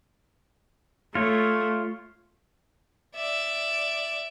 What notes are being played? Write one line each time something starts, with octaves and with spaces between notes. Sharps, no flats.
A3 F4 C#5
D5 E5